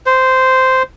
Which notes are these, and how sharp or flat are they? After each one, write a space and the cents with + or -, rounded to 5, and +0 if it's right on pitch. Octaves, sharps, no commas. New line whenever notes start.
C5 -10